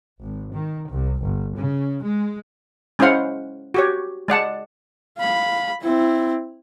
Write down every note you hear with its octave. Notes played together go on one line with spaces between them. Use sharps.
G#1
D#3
C2
G1
C#3
G#3
G#3 C#4 E4 C5 F5 F#5
F#4 G4 C#5
G#3 D5 F#5 A5
F5 B5
C4 E4